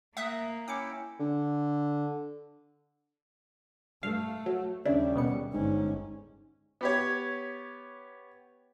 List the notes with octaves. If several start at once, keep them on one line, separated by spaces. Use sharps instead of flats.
A#3 E5 D#6 F#6
C#4 E4 G5 D6 C#7
D3
G2 A3 F5
F#3
D#2 C#3 G3 D4 E4
B2 B3 C#7
G1 G#2 C#4
B3 G4 C#5